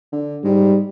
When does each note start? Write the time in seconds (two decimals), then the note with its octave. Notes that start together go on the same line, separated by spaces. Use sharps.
0.12 D3
0.44 G#2 G3